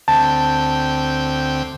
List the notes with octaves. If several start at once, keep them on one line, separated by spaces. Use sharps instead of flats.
D2 C4 G5 A5